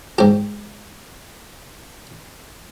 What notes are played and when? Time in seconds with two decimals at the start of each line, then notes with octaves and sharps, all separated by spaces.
0.18 G#2 G4